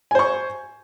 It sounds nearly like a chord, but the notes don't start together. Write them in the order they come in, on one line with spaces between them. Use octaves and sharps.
G#5 C5 C#6